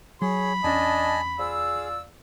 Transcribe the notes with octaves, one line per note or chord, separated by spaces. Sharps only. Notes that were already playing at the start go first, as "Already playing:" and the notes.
F#3 G#4 C#5 B5
E2 C#4 D4 D#5 G#5 A5
F4 G#4 D5 E6